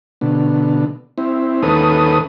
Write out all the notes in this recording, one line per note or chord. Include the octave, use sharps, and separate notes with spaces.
B2 D3
C4 E4
D#2 C#4 A4 B4 D#6